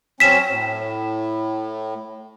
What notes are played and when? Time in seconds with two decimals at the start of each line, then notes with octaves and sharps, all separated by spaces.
0.20 F#3 C4 C#4 B6 E7
0.50 A2